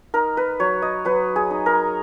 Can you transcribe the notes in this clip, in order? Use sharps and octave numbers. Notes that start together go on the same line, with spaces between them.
D#4 A#4
B4
F#3 C#5
D#5
F#3 B4
G#4
D#4
A#4